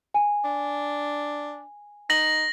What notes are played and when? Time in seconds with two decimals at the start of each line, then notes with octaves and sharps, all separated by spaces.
0.14 G#5
0.44 D4
2.10 D#4 A#6 F#7